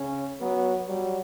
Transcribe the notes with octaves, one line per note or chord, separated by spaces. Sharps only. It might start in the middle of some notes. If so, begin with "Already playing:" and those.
Already playing: C#3 C#4
F#3 B3
F#3 G3